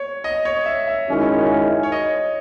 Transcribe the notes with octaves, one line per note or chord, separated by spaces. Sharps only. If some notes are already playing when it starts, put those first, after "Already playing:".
Already playing: C#5
D#5
C#5
E5
E5
F#2 D#3 G#3 C#4 E4
C#5
D#5